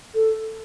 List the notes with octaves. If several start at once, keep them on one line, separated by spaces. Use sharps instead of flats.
A4